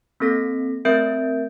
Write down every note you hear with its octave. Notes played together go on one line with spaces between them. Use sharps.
A#3 C4 A4 A#6 B6
A3 C4 A#4 E5 G6 D7